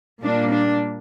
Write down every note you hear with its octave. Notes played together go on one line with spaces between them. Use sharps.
A#2 G3 A#3 D4
D4